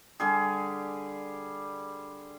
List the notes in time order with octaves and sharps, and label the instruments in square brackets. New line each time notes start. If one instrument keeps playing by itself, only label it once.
[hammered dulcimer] D3 G3 G#4